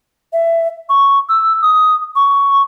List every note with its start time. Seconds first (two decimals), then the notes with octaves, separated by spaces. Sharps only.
0.33 E5
0.89 C#6
1.29 E6
1.62 D#6
2.16 C#6